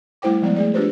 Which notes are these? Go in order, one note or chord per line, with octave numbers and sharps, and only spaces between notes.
G3 A3 E4 C5 G5 D6
F3 G3 G#3 B3 D5
A3 G#4 D5
D4 F4 G4 B4 C5